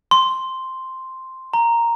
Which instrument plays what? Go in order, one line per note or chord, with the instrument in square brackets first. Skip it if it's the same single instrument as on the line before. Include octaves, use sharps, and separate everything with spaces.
[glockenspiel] C6
A#5